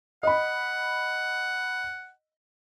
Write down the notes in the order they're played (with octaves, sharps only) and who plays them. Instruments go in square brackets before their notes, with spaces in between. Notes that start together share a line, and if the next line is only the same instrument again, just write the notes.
[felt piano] D#5 B5 [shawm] F#5